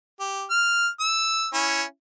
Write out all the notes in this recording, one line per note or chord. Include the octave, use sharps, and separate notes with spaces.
G4
F6
E6
C#4 E4